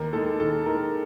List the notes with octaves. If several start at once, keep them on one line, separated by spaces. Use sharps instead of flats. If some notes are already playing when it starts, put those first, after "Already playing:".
Already playing: D#2 A#4
D#3 G#3 A4
D#2 A4
D#3 G#3 A#4